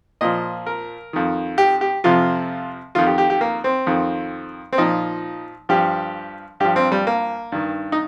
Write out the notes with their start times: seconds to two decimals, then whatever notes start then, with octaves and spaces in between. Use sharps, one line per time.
0.21 A#2 F3 D#5
0.67 A#4
1.13 F2 D#3
1.58 G4
1.81 G4
2.04 F2 C3 F3 F4
2.95 F2 D#3 F4
3.07 G4
3.18 G4
3.30 G4
3.41 A#3
3.64 C4
3.87 F2 D#3
4.73 C4
4.78 A#2 F3 D#4
5.69 G2 F3 G4
6.60 G2 F3 G4
6.76 C4
6.92 G3
7.07 A#3
7.52 G2 D#3
7.92 D#4